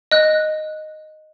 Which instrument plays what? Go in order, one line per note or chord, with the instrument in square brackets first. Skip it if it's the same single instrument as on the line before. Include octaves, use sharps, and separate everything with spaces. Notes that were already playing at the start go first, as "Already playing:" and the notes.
[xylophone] D#5 F#6